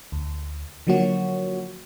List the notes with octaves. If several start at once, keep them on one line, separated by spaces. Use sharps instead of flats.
D2
D3 F3 F#3 A#3 F#4 C#5